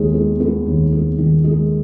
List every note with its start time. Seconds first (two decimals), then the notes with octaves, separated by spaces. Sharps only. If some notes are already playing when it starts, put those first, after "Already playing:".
Already playing: D#2 G#3
0.14 B3
0.40 B3
0.66 D#2
0.92 B3
1.19 D#3
1.44 G#3